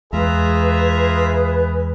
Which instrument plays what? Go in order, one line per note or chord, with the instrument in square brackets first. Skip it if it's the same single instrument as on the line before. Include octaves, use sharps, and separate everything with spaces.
[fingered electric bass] E2 G#3 [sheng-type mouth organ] F4 E5 A#5 [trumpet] G#4 [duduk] B4